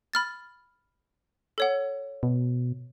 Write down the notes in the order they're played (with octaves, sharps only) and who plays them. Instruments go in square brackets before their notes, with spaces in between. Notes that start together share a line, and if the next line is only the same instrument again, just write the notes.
[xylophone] B5 F6 A6
A4 C#5 F#5
[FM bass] B2